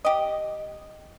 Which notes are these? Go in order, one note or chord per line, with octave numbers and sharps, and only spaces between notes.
G4 D#5